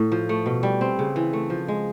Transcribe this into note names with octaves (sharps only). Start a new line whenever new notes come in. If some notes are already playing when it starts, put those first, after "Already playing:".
Already playing: A2
F3
A3
B2
G3
C4
C#3
E3
A3
F3
G#3